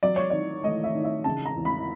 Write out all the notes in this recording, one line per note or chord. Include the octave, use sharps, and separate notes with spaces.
F#3 D5
C#5
D#3 D5
A3 D#5
E5
D#3
E5
C#3 A5
A#5
E2
B5